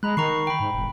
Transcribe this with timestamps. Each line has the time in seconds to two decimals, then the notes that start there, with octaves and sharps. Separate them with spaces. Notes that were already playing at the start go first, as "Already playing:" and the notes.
0.03 G#3 A#5 B5 F#6
0.17 D#3 A#5 C#6 C7
0.47 G5 B5
0.60 G#2
0.74 E1